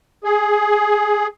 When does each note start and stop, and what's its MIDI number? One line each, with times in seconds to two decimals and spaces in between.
0.24 1.27 68